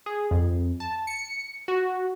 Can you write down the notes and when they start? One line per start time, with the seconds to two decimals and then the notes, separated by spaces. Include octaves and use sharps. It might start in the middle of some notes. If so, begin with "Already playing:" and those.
0.06 G#4
0.31 F2
0.80 A5
1.07 C#7
1.68 F#4